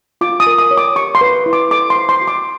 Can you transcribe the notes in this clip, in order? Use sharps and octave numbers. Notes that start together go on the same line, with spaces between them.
F4 D6
D#6
A#4
D#6
C#5
D6
G4 C#6
C6
B4
E4
D6
A4 D6
C6
C5
C6
F#4
D6